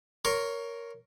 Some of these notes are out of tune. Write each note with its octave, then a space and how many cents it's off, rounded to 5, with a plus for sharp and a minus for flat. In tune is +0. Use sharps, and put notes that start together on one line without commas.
A#4 +0 C#5 +10 C6 +40